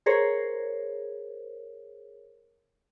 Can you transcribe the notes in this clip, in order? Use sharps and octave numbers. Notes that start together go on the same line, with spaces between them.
G#4 A#4 C5 C#5